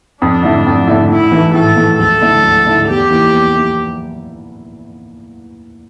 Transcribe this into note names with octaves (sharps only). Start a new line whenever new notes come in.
F2 D4
D3 A3 E4
F2
D3 A3 E4
A2 E4
E3 A3
A2 A4
E3 A3
D2 A4
D3 A3 E4
D2
D3 A3 E4
E2 G4
E3 A#3 E4
E2
A#3 E4